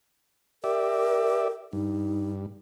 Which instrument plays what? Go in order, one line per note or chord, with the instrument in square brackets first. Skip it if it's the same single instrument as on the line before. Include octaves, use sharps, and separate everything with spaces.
[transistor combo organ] G4 D5 E5 [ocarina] A#4
[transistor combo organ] G2 [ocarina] D#4